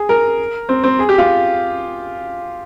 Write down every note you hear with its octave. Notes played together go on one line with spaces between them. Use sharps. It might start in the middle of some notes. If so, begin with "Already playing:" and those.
Already playing: G#4
A#4
C4
C4
G#4
G4
F4